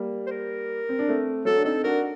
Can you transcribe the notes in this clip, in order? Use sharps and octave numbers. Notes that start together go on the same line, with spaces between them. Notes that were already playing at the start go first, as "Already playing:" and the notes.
Already playing: G3 A#3
C5
A#4
C4
D4
A3 C4
F#3 A3 A4
D4
C4 D#4 A4
D4 F#4 A#4